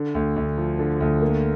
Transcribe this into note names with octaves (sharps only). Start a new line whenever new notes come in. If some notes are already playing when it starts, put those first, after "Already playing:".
Already playing: D3
D2
D2
F3
D3
D2
A#3